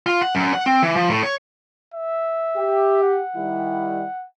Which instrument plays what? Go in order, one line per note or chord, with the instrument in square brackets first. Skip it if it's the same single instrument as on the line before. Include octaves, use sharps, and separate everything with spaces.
[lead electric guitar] F4
F#5
F#2
F#5
C4
E3
F3
A2
C#5
[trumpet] E5
[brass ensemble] G4
[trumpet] F#5
[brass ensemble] D#3 G3 E4